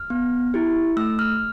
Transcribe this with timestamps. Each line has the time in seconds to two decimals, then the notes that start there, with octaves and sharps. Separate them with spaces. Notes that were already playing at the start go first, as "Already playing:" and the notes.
Already playing: F6
0.10 B3
0.54 E4 G4
0.97 A3 E6
1.19 F6